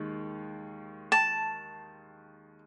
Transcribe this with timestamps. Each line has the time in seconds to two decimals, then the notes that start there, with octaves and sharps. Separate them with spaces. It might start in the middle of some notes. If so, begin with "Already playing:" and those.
Already playing: D#2 D#3 G#3
1.12 A5